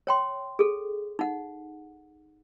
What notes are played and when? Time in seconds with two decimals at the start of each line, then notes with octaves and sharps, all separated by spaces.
0.07 C#5 G5 C6
0.59 G#4 A4
1.19 D#4 F#5